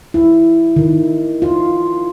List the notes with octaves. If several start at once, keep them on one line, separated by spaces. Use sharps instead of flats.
E4
D#3
F4